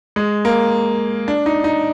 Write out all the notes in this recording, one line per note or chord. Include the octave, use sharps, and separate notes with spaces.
G#3
A#3
D4
D#4
D#4